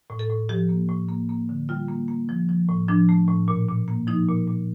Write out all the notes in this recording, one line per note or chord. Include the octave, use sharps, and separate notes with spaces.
A2
A4
A2
F3 G4
A#3
A2
A#3
A#3
D3
G3 F4
A#3
A#3
F3
F3
A2
F3 D4
A3
A2
A#2
A#2
A#3
F3 D#4
A#2
A#2